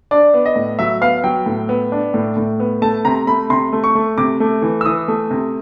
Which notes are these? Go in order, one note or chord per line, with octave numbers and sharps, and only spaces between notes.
D4 D5
B3
D#5
A2
F#3 E5
B3 F5
F#3 G5
A2
B3
D4
A2
A2
B3
A3 A5
C3 A#5
A3 B5
C3 C6
A3
C#6
A3
C3 D6
A3
E3
E6
E3 D#6
A3
C3